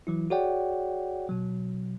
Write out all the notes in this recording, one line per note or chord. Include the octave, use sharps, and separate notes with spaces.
E3 F#3 E4
F#4 G#4 C#5 D5 F#5 G5
B2 F#3